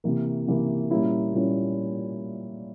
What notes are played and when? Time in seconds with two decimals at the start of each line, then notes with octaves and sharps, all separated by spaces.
0.04 C3 E3 A#3
0.47 C3 E3 A#3
0.91 A#2 G3 A#3 C#4 E4
1.34 A#2 G3 A#3 C#4 E4